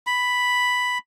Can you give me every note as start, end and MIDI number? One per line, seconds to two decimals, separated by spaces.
0.07 0.98 83